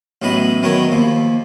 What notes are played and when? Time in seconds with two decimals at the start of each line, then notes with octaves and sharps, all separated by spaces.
0.22 A1 A2 F#3 B3 D#5 B5
0.63 D#3 F#3 B3 D#4 A#4 C#5
0.92 D#2 F3